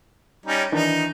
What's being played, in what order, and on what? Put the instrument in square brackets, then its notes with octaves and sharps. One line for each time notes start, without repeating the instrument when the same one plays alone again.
[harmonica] G3 C#4 D#4
[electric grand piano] D#3 E3 D4 [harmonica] D#4